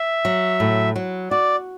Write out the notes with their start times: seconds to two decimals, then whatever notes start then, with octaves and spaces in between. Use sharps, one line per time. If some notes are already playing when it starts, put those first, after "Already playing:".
Already playing: E5
0.25 F#3
0.60 A2
0.96 F#3
1.31 F#4 D5